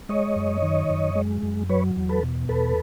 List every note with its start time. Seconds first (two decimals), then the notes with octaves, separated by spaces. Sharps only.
0.09 G#3 C#5 D#5
0.36 F#2
0.62 D#3
0.90 F#2
1.15 G#3
1.43 F#2
1.69 F#3 B4 C#5
1.96 E2
2.09 A4 B4
2.23 B2
2.49 E2 A4 B4